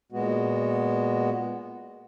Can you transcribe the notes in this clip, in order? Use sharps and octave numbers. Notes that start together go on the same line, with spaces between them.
A#2 G#3 B3 F#4